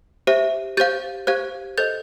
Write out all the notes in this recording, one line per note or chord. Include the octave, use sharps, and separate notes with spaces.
G4 C5 E5
G4 C5 F5 G6 A6
G4 C5 F5 F#6 G#6
A4 C5 D#5 G6 A6